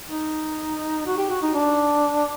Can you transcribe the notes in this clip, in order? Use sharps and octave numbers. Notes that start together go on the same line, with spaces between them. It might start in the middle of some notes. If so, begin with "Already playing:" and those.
D#4
F#4
G4
F#4
D#4
D4